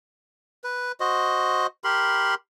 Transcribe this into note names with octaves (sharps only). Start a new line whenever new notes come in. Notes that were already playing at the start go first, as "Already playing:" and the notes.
B4
F#4 C5 D#5
G4 A#4 B5 C6